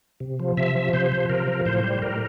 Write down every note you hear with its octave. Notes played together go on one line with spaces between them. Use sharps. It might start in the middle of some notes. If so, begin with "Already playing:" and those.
C3
F3
C3 E5
F3
C3 C5
F3
C3 A#4
F3
A2 C5
G3
A2 A#4